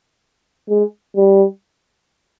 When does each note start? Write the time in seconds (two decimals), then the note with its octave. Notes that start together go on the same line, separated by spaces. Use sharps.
0.69 G#3
1.16 G3